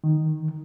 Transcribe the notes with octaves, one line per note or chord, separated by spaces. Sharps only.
D#3